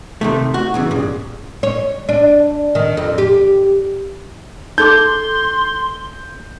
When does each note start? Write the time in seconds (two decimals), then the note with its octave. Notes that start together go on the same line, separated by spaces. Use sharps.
0.21 C3 D#3 A3
0.54 F#4
0.74 B1 C#3 E3
0.91 G2 A#2 C#3
1.63 C#5
2.09 D4
2.75 D#3
2.97 F2
3.18 G4
4.78 D#4 A4 C6 D6 G6